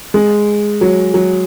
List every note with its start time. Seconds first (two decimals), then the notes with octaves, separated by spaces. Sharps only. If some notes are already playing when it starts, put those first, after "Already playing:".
0.14 G#3
0.81 F#3
1.14 F#3